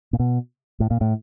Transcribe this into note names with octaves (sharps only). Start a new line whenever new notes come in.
A#2
B2
A2
A#2
A2